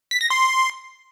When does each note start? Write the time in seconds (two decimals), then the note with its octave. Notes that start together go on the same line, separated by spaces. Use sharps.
0.11 B6
0.21 A#6
0.30 C6